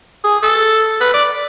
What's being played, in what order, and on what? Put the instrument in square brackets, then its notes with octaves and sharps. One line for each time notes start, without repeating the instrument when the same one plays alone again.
[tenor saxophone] G#4
A4
B4
D5